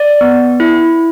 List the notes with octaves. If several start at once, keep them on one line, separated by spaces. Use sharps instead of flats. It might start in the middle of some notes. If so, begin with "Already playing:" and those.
Already playing: D5
B3
E4